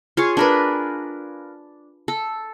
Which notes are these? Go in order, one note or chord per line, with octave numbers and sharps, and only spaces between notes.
F4 G#4 C#5
D4 A#4 B4
A4